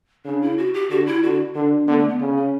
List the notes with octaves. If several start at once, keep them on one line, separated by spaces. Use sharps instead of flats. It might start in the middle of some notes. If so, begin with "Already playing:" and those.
C#3 D4
E4
F#4
G4
D3 F#4
E4
D3 F#4
D3 D4
D3 B3
A3
B3
C#3 C#4
C#4